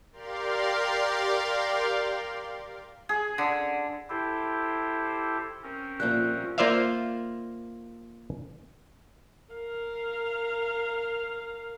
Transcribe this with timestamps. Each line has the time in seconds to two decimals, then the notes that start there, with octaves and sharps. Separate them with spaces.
0.12 G4 A#4 D5 F5 C6
3.09 G#4
3.38 D3
4.10 E4 G4 A4 C5
5.63 C4 C#4 A#4
6.00 A#2 F3 G3 A#3 E5 F#6
6.58 A#3 F4 C5 D5 E5 F5
9.53 A#4 F5